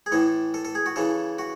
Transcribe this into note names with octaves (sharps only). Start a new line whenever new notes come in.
G#4
A2 E3 A4
A4
A4
G#4
F#4
C#3 E3 A4
F#4